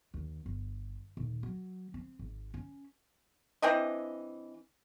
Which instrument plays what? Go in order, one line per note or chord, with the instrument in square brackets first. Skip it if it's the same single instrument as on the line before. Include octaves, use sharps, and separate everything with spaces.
[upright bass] D#2
G1
D#1
F#3
C4
G#1
C#4
[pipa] E3 C4 D4 D#5